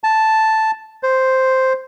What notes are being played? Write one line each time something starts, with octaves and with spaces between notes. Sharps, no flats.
A5
C5